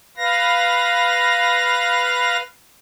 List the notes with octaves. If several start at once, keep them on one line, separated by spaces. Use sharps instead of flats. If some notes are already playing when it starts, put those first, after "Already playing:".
B4 F5 A#6